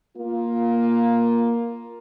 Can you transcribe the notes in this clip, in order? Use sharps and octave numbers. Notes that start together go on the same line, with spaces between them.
A#3 F4